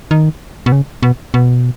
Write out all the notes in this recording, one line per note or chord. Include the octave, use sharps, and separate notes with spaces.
D#3
B2
C#3
B2
B2